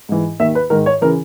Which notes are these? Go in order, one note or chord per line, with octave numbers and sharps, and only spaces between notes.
G#2 E3
D#2 D#3 E5
B4
G#2 D#3 A#4
C#5
C#3 E3 A#4